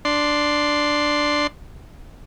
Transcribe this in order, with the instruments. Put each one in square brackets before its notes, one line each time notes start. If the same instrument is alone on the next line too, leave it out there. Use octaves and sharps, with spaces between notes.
[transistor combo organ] D4 C6